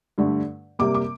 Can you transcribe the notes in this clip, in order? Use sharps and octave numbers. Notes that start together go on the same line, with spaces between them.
G2 D3 A3
C3 G3 A#3 D6
D6